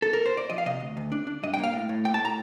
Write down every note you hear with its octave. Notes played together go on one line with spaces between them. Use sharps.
A4
A#4
C5
D5
F3 D#5
F5
C3 D#5
D2
D2
D4
D4
G2 D#5
G5
A#3 F5
A2
A2
A#3 G5
A5
A2
A#5